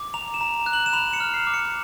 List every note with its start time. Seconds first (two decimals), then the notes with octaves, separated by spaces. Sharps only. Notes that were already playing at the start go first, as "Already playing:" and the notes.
Already playing: D6
0.14 A#5 F7
0.34 E7
0.41 A#5
0.66 F#6
0.73 F#7
0.86 E7
0.93 B5 F7
1.13 C#7
1.20 F6
1.34 C7
1.47 D6
1.54 C#7